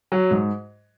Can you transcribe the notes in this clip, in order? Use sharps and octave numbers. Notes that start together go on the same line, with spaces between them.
F#3
G#2